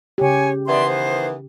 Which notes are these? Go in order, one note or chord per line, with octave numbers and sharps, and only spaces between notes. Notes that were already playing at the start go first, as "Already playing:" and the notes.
C#3 G4 C#5 G#5
D#3 E3 B3 D5 E5 C6
C5